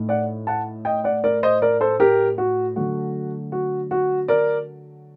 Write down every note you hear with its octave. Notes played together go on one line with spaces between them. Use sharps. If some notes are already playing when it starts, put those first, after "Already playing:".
Already playing: A2 A3 D#4
D5 F#5
F#5 A5
D#5 G5
D5 F#5
A#4 D5
C5 D#5
A#4 D5
A4 C5
G4 A#4
F#4
D3 F#3 A3 F#4
F#4
F#4
A#4 D5